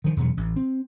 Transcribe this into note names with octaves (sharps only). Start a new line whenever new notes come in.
D#3 F3
E2 B2 F#3
A1
C4